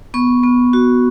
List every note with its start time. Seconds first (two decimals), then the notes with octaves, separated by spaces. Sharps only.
0.14 B3 C#6
0.43 B3
0.73 F#4